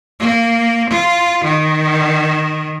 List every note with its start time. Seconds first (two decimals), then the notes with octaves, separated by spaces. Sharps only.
0.20 A#3
0.90 F4
1.44 D#3